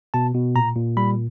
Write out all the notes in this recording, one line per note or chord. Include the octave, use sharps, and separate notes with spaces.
B2 A5
B2
A#2 A#5
A#2
G3 B5